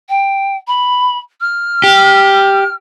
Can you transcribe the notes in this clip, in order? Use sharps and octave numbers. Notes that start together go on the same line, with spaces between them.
G5
B5
F6
G4